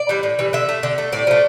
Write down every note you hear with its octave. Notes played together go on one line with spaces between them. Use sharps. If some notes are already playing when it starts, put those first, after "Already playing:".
Already playing: D5
E3 G3
A2
E3 G3
D3 E5
A3
D3
A3
A2 D5
F3 A3